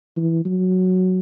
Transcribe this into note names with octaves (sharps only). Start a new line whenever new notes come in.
E3
F#3